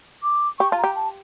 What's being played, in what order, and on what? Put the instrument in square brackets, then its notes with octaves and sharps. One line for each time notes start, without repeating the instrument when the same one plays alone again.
[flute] D6
[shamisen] G4 [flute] C#6
[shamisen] F4 [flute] A5
[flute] A#5
[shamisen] G4
[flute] A5